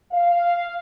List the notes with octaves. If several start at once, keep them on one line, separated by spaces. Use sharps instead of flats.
F5